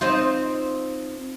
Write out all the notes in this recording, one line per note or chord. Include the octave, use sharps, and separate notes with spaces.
C4 D#4 F4